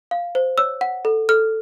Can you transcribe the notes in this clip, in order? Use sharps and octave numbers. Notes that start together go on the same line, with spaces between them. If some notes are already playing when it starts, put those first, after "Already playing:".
F5
C5
C#5 E6
F#5
A4
A4 F6